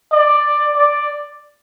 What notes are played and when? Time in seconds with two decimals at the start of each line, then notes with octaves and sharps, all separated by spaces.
0.13 D5
0.76 D5